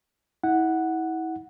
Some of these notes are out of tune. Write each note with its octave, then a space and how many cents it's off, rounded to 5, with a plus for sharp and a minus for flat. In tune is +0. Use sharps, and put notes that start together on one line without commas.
E4 -35 F#5 +0